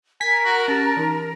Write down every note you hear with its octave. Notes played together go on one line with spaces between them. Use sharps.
A#4 G#5 B6
F#4
C#4 G4 A5 A#5
E3 D#4